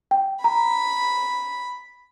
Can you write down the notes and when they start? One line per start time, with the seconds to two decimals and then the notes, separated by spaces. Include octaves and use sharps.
0.11 G5
0.44 A#5 B5